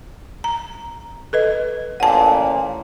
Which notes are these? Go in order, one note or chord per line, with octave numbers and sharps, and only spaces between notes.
A#5
A4 B4 D#5
A1 A#2 F#5 A5